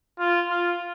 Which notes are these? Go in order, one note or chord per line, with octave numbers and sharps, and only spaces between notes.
F4
F4